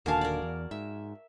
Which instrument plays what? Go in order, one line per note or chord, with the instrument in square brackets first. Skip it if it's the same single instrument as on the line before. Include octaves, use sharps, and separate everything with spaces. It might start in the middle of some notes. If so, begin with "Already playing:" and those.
[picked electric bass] D#1 D#2 D3 [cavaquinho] F#4 G#5 A5 [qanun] A#4 F5
[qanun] A#4 D5
[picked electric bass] E2
[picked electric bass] G#2 [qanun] E5